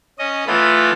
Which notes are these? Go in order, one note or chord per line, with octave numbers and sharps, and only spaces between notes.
C#4 D#5
E3 A3 B3 F4 B5